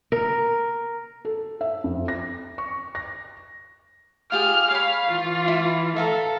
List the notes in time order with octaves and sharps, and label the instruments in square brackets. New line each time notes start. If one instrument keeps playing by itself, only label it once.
[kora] A#4
[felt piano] A4
E5
F2
A#6
C#6
A#6
[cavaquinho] F4 G4 G#4 [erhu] F6
[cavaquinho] C#5 B5 [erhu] F5
[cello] E3 [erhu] F4
[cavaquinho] E4
[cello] A4 [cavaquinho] E5 F5 A#5